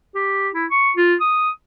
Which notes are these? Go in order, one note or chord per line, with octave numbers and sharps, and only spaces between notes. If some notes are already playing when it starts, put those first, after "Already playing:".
G4
E4
C#6
F4
D#6